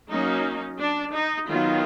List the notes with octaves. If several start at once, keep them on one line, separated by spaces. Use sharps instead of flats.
F#3 A#3 C#4 D#4
D4
D#4
D#3 F#3 B3 F4